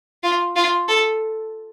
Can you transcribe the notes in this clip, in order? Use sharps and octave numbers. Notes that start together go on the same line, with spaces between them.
F4
F4
A4